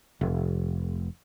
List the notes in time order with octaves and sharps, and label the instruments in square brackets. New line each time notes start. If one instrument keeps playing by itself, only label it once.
[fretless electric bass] F1